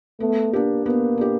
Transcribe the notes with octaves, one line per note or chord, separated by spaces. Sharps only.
A3 B3
A#3 D4 G4
A#3 B3
D4 G4